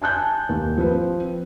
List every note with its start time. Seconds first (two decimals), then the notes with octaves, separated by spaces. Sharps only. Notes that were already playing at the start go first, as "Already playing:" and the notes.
0.02 G#5 A5 F#6 G6
0.49 D#2
0.78 F3 C4 B4